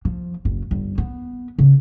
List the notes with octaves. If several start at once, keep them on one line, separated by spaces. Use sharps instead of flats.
F3
F#1
G1
B3
C#3